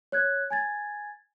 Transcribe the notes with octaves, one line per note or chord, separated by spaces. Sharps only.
C#5 F#6 G#6
G#5 G#6 A6